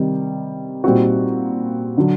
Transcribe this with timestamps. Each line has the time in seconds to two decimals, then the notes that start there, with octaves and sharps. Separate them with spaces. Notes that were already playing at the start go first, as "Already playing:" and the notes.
Already playing: C3 D#3 G3
0.84 A#2 G3 C4 D#4 F#4
1.98 D3 F#3